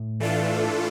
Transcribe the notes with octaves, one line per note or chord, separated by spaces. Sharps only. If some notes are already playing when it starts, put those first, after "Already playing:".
Already playing: A2
E3 A3 D4 F4 A4